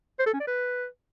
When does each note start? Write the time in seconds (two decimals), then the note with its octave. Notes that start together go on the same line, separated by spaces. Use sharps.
0.19 C5
0.26 A4
0.33 C#4
0.40 D5
0.47 B4